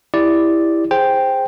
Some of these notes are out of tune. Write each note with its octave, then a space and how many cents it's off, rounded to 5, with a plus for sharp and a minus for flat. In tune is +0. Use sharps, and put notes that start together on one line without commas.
E4 +0 G4 +25 D5 +0
G#4 -10 C5 +0 G5 +0